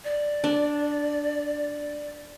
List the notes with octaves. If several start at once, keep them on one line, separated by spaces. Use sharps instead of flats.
D5
D4